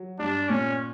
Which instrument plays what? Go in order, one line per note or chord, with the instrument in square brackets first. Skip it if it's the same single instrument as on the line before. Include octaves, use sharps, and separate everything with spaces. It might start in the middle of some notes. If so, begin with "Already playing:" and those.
Already playing: [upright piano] F#3
[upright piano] G2 [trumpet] D4
[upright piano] A#2 [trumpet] C#4